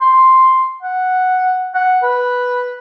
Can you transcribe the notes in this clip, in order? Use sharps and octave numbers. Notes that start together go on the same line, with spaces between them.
C6
F#5
F#5
B4